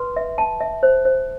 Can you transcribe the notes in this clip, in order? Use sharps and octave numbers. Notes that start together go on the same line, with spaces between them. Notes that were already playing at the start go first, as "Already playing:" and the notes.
Already playing: B4 C6
E5
A5
E5
C5
C5